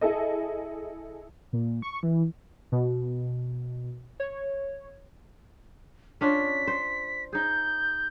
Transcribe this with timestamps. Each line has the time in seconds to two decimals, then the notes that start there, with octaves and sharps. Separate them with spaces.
0.01 E4 G#4 A4 D#5
1.53 A#2
1.82 C#6
2.03 E3
2.72 B2
4.20 C#5
6.21 C#4 D4 F4 B6
6.67 C5
7.33 D#4 G#4 G6